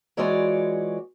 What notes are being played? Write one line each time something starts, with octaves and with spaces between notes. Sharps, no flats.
E3 G#3 F4 F#4 C#5 D5